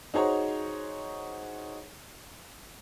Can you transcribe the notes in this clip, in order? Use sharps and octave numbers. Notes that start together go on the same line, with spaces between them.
D#4 F#4 G#4 C5 C#5 A#5